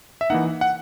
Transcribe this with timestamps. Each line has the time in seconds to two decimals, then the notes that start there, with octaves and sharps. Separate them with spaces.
0.21 E5
0.30 E3 A#3 D#4 F#5
0.61 F#5